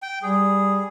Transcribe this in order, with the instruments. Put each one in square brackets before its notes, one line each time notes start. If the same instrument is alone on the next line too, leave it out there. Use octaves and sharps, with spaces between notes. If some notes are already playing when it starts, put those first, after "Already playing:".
[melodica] G5
[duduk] G3 [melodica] G#4